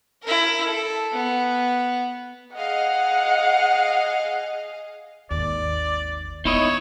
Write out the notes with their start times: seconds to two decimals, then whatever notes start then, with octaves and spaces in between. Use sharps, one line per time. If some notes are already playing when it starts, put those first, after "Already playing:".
0.23 E4 A#4
0.65 A4
1.12 B3
2.56 G#4 D#5 F5 F#5
5.31 G#1 D#2 D5
6.45 B3 D#4 E4 C#5 D#5